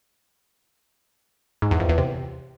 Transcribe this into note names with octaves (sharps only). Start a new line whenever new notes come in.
G#2
E2
F2
E2
C3